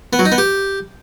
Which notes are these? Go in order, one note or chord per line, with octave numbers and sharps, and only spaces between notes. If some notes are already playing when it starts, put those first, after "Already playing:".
B3
F#3
D#4
B3
G4